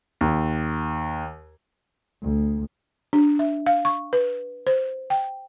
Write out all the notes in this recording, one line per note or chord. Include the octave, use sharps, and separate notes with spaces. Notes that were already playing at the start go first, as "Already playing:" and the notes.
D#2
D2
D4
E5
F5
C#6
B4
C5
G5